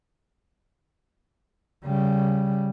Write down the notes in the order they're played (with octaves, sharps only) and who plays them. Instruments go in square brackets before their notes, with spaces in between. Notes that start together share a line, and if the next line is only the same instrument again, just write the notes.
[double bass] C#3 G3